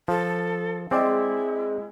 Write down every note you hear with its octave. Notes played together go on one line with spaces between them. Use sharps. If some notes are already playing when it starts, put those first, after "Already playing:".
F3 A4
G#3 C4 E4 D5